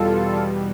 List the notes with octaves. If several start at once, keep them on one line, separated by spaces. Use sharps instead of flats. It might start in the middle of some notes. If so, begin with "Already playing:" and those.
Already playing: E2 B2 G3 F4 A4